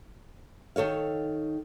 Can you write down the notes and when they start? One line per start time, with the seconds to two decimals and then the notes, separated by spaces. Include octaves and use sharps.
0.76 D#3 A4 C#5 F5